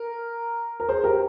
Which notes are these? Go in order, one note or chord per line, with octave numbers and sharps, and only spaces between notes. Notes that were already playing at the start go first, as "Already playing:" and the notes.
Already playing: A#4
A#4
G#4 C5
G4 A#4